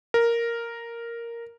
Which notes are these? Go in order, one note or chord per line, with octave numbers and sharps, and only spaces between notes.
A#4